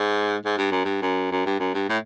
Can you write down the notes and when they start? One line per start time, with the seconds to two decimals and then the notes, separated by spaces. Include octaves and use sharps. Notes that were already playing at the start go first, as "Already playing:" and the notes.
Already playing: G#2
0.45 G#2
0.58 G2
0.71 F#2
0.85 G2
1.02 F#2
1.31 F#2
1.46 G2
1.60 F#2
1.74 G2
1.89 A2